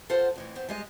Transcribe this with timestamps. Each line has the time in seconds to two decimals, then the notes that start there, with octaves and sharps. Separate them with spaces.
0.10 F4 A4 C5 F#5
0.36 F2 A2 E3
0.55 B3 C4
0.68 G3 G#3 D#5